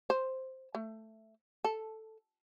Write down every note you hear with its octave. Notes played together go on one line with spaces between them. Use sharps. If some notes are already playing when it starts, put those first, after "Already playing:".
C5
A3
A4